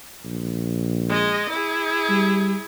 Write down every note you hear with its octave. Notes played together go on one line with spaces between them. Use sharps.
A#1
G#3 D#5
E4 G#4
G3